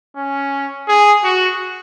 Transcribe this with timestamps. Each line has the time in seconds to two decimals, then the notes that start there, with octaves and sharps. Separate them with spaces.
0.16 C#4
0.88 G#4
1.24 F#4